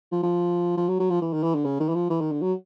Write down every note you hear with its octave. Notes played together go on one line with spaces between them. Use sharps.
F3
F3
F3
F#3
F#3
F3
E3
D#3
E3
D3
C#3
D#3
E3
F3
E3
D#3
D3
F#3